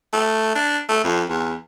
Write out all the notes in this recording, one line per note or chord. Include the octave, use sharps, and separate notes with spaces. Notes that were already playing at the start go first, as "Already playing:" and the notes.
A3
D4
A3
F2
E2